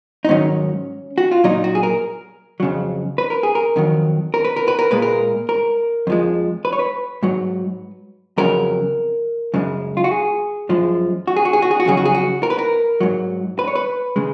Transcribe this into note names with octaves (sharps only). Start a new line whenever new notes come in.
D#4
G#2 D#3 F#3 C#4
F#4
F4
A#2 F#3 D#4
F#4
G#4
A#4
F2 C#3 F#3
B4
A#4
G#4
A#4
F2 D#3 F#3
A#4
B4
A#4
B4
A#4
A#2 G#3 B4
A#4
A#4
F2 F3 G#3
B4
C#5
B4
G#2 F#3
F2 C#3 F#3 A#4
F#2 C#3 G#3
F4
F#4
G#4
F#2 F3 G#3
F#4
G#4
F#4
G#4
F#4
G#4
F#4
F2 C#3 F#3 G#4
F#4
G#4
F#4
A#4
B4
A#4
G#2 F#3
B4
C#5
B4
C#3 G#3